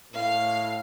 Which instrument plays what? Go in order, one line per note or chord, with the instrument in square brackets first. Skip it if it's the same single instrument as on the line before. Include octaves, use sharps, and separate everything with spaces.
[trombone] A2 [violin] F5